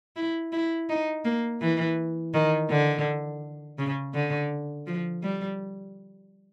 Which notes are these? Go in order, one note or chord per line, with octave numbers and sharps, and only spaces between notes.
E4
E4
D#4
A#3
E3
D#3
D3
C#3
D3
F3
G3